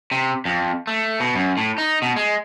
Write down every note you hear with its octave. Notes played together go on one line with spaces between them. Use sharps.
C3
F2
A3
B2
F#2
A2
D#4
B2
G#3